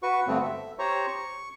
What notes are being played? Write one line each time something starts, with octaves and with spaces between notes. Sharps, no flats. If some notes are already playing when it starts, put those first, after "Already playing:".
F#4 B4 C#6
G2 D3 A3 B3 C4
E5
G4 C5 C#5 A#5 C#6
C#6